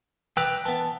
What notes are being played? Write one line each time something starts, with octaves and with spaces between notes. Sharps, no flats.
B4 D5 G5 A#5 E6 F#6
E3 B3 A5